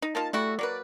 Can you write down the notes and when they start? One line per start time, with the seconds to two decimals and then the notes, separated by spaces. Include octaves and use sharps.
0.02 D#4
0.15 A#3 D#4 F4 A5
0.33 G3 A3 E4 F#4
0.59 F#3 A#3 B4 D5